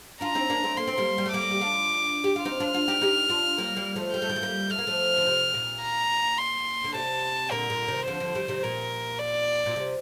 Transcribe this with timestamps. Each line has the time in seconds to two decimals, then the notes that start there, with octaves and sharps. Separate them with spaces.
0.21 D4 F4 A#5
0.35 C4 D#4
0.50 A#3 D4
0.64 A3 C4
0.77 A#3 C6
0.87 C4
0.98 G3 A#3
1.18 G3
1.26 A3
1.33 G3 A#3 D6
1.51 G4
1.61 D4 F4
2.24 G4
2.36 F4
2.45 C4 D#4 F6
2.60 D4 F4
2.74 D4 F4
2.88 D#4 G4
3.01 D#4 G4
3.29 D4 F4
3.58 G3 A#3
3.77 G3 A#3
3.96 F3 A3
4.14 G3 G6
4.22 A3
4.29 D#3 G3
4.36 A3
4.42 G3 A#3
4.70 A3 F6
4.78 A#3
4.87 F3 A3
5.17 D3
5.27 C3
5.54 A#2
5.82 A#5
6.38 C6
6.84 D3
6.94 C3 A5
7.51 A#2 D3 A#4
7.70 A#2 D3
7.88 C3 D#3
8.07 D3 F3 C5
8.20 D3 F3
8.35 D#3 G3
8.48 C3 D#3
8.63 A#2 A#4
9.19 D5
9.66 A#2
9.76 C3